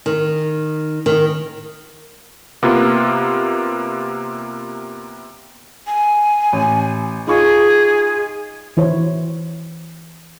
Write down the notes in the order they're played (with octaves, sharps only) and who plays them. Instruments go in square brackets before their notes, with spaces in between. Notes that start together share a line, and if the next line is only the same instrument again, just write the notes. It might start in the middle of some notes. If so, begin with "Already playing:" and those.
[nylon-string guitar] D#3
D#3
[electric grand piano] C3 A#3 B3 F4
[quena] G#5
[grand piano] A1
[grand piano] D#4 F4 C#6 [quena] G#4
[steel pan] E3 E4 C5 C#5